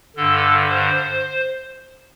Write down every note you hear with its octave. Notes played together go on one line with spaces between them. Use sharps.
G2 D3 A4
C5